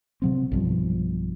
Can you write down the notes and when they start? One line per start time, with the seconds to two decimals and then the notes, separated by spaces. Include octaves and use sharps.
0.22 C3 F#3 C4
0.52 B1 G2 F3